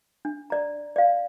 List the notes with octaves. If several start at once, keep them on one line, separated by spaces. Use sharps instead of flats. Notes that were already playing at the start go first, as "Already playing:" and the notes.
D4
D5 A#5
D5 F5